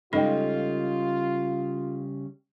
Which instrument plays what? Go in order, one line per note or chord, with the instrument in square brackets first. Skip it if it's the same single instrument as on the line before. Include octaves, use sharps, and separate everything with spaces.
[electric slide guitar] C#3 G3 [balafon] G#3 D#4 [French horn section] F4 [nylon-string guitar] A4 D#5 G5